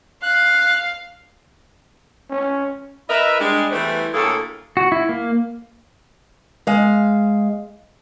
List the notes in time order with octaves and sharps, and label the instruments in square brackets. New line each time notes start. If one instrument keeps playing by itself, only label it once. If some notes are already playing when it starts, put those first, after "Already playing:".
[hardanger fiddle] F5 [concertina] F#6
[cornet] C#4
[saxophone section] E4 A#4 B4 D#5 E5
G3 G#3 D4
E2 E3 G3 A3 B4 C5
D2 A2 A#3 G#4 A4
[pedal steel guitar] F#4
E4
A#3
[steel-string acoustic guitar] G#3 F5